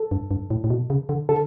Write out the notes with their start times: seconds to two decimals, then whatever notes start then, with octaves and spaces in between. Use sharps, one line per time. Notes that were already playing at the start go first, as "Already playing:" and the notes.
Already playing: A4
0.11 G2
0.31 G2
0.50 A2
0.64 A2
0.70 B2
0.90 C#3
1.09 D3
1.29 D3 A4